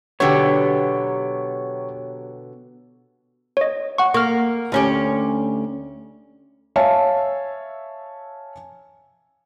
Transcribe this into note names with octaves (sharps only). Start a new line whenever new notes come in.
B2 D3 F#3 B3 G4 C#5
C#5 D#5
F#5 C#6
A#3 C#6 F6
D2 C#4 G4
C#5 E5 F5 G#5 A5